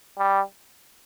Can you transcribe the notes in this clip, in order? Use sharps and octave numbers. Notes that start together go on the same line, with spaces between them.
G3